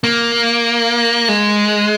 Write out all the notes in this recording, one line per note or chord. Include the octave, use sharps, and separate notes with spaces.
A#3
G#3